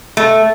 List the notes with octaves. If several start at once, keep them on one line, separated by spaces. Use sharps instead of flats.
A3